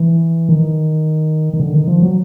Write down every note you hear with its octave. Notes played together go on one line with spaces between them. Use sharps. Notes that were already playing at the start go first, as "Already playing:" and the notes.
Already playing: E3
D#3
D#3
D3
D#3
F3
F#3